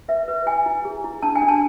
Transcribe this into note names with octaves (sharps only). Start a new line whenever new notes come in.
B4 E5
B4
E4 G#5
E4
G#4
E4
D4 A5
G#5
D4
A5